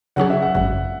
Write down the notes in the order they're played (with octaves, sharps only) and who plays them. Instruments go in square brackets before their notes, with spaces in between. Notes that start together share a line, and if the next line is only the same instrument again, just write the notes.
[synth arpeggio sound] C#3 F#3 C#4 G#4 [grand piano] F#5
[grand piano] E5
F#5
[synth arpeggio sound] G#1 F#2 C#3 [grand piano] F#5